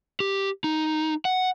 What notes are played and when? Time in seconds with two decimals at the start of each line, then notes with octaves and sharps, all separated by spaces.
0.20 G4
0.64 D#4
1.25 F#5